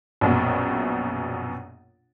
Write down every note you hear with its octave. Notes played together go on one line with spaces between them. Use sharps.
A#1 F#2 B2